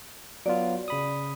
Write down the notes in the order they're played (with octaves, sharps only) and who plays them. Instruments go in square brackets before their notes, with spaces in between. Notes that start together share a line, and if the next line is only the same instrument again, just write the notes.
[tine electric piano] F#3 B3 F4 [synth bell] D5
[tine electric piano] C#3 B5 D#6